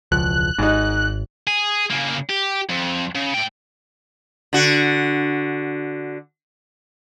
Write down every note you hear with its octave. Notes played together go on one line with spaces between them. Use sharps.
E1 C#2 F3 F#6
G#1 G#2 D#4
G#4
C#3 A#3
G4
F2
C#3
A2 G5
D3 F#4